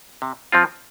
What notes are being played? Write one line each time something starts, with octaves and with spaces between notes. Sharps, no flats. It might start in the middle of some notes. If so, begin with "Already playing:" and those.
C3
F3 C4 F4